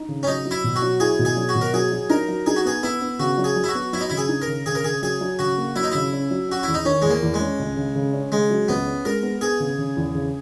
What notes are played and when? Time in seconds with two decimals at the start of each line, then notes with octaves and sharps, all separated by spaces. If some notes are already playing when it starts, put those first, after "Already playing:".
Already playing: D#4
0.08 C#3
0.23 C#4
0.27 F#3 D#4
0.45 F#3
0.51 E4
0.64 B2
0.76 F#4
0.82 F#3
1.00 E4 G#4
1.19 B2
1.25 G#4
1.37 F#3
1.49 F#4
1.55 B2
1.61 A#4
1.74 F#3 G#4
1.92 F#3
2.10 D#4 A#4
2.28 F#3
2.46 D#4 G#4
2.56 F#4
2.65 B3 G#4
2.83 B3 E4
3.01 B3
3.19 C#3 F#4
3.38 F#3
3.44 G#4
3.56 F#3
3.64 E4
3.69 F#4
3.75 B3
3.93 F#3 E4
4.01 D#4
4.10 C#3 E4
4.17 G#4
4.29 D#4
4.42 A#4
4.47 C#3
4.66 C#3 G#4
4.75 A#4
4.84 C#3 G#4
5.02 F#3 G#4
5.21 F#3
5.39 C#3 F#4
5.58 A#3
5.76 F#3 E4
5.84 D#4
5.92 C#3 E4
6.12 C#4
6.31 F#3
6.49 C#4 F#4
6.63 E2 E4
6.74 D#4
6.85 D#3 C#4
7.02 E2 G#3
7.10 A#3
7.22 E2
7.34 G#3
7.40 C#4
7.59 C#2
7.76 C#3
7.95 C#3
8.13 C#4
8.32 C#3 G#3
8.50 F#3
8.68 C#2 B3
8.86 C#4
9.05 G#3 A#4
9.23 B3
9.41 B3 G#4
9.60 C#3
9.78 C#3
9.97 E2
10.15 C#3